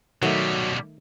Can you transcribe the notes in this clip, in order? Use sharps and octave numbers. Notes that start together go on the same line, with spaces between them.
B2 D#3 F#3 G3 A3